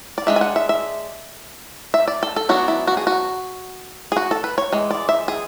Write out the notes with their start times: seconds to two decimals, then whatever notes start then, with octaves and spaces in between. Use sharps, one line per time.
0.18 D5
0.27 G#3 D4 E5
0.36 G#5
0.41 F#5
0.56 E5
0.69 E5
1.94 E5
2.08 D5
2.23 A4
2.36 A4
2.49 F#3 B3 D4 F#4
2.68 E4
2.87 F#4
2.97 G#4
3.07 F#4
4.12 G#4
4.17 F#4
4.31 A4
4.44 B4
4.58 C#5
4.73 E3 G#3
4.90 D5
5.09 E5
5.28 G#4